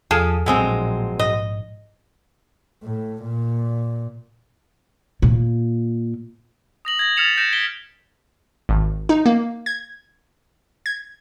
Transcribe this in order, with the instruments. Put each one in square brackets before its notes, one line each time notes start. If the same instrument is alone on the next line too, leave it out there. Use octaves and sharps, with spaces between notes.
[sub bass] E2 [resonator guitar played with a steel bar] F3 [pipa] G#4 A4
[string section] A#1 [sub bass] A2 [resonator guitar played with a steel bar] F#3 G#3 C4
[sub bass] G#2 [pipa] D#5
[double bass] A2
A#2
[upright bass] A#2
[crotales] D#6 A#6 F#7
G#6 A#6
F6 A6 B6 C#7 E7 F7
G6 A#6 C#7 D7 E7
B6 D7 G7
[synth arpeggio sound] G#1
D#4
A#3
G#6
G#6